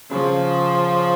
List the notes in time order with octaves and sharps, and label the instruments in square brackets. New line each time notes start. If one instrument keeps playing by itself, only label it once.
[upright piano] C#3 [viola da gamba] F3